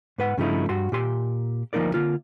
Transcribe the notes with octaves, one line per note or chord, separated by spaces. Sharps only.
G#2 B4 F#5
G2 C#3 F3 A3 D#4 E4
G2 F#4 C6
A#2 G4 C6
D2 F3 A#3 D#4 A#4 D5
D3 A#3 F4